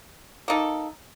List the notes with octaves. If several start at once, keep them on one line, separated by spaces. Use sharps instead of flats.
A#3 D#4 A4